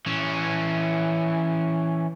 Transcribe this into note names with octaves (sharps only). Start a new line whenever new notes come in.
E3 C#4